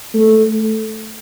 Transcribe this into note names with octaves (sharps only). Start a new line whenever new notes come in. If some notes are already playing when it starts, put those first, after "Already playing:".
A3